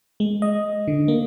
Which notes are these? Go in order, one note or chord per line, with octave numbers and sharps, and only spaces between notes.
G#3
D#5
D3
A#3